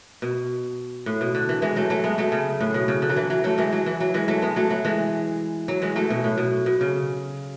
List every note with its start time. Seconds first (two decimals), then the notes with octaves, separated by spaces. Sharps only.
0.22 B2
1.06 A2
1.21 B2
1.35 D3
1.49 E3
1.62 E3 G#3
1.76 F#3 A3
1.90 F#3 A3
2.04 G#3 B3
2.18 F#3 A3
2.32 C#3
2.61 A2
2.74 B2
2.88 C#3
3.02 D3
3.09 F#3
3.16 E3
3.30 F#3
3.44 F#3 A3
3.58 E3 G#3
3.73 F#3
3.86 E3
4.00 F#3
4.14 E3 G#3
4.28 F#3 A3
4.42 G#3 B3
4.56 F#3 A3
4.71 F#3
4.85 E3 G#3
5.68 F#3
5.82 E3 G#3
5.96 F#3 A3
6.10 B2
6.24 A2
6.38 B2
6.66 B2
6.81 C#3